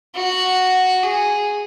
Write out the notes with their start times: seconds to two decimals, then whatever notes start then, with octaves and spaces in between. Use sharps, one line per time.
0.15 F#4
1.03 G#4